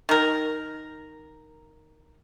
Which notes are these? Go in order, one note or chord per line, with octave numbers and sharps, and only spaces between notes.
D#3 A#4